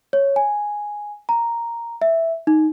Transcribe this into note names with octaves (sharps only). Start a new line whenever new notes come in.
C#5
G#5
A#5
E5
D#4